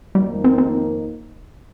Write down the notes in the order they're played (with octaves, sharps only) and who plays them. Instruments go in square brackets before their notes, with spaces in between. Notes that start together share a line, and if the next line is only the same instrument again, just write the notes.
[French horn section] F2 D#3 A#3 D#4 [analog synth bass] G3
[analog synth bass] C4
C4